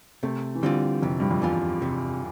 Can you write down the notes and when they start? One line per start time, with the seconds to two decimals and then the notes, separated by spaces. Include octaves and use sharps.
0.23 C3 A3
0.55 E3
0.63 D3 G3 C4 F4
1.02 F2 C3
1.20 G2
1.31 F2
1.42 E2 G3 C4 F4
1.82 C3